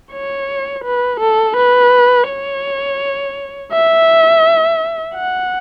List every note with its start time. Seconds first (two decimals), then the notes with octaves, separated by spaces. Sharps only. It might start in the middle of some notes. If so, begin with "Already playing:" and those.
0.12 C#5
0.84 B4
1.20 A4
1.56 B4
2.28 C#5
3.72 E5
5.15 F#5